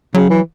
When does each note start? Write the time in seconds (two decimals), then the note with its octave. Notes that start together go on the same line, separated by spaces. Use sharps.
0.14 C#3 F#3
0.30 E3